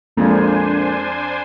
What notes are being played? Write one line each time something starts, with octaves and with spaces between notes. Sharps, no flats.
A#1 F2 G#3 A#3 D4 C5 G#5